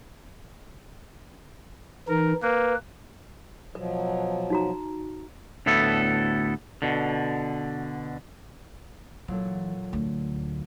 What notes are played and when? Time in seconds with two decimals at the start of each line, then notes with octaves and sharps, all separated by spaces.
2.09 E3 D#4 A#4
2.43 A#3 B4
3.75 B2 F3 F#3 B4
4.50 D#4 F#4 A#5
5.66 D2 A2 B3 E4 A4
6.82 B2 D3
9.28 A#2 E3 F#3 A4
9.93 D2